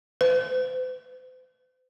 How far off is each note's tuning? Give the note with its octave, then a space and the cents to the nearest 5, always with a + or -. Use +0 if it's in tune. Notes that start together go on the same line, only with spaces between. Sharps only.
C5 -45